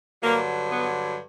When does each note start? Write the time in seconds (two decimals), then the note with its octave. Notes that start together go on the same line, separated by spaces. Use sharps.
0.23 G2 D3 F#3 A#3
0.71 B3